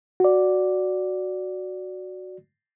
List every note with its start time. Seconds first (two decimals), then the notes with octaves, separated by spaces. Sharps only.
0.20 F#4 D5